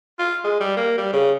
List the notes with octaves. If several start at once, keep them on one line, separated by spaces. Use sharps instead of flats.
F4
G#3
G3
A#3
G3
C#3